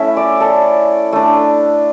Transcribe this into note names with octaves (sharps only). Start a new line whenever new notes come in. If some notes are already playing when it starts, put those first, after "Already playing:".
Already playing: A3 C#4 E4 E5
D5
A4
A3 D4